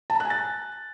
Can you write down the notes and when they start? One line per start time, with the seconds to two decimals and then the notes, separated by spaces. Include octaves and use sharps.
0.10 A5
0.15 A#5
0.20 F#6
0.25 G#5
0.30 A6